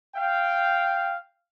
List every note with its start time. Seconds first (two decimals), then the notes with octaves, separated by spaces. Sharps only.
0.15 F5 G5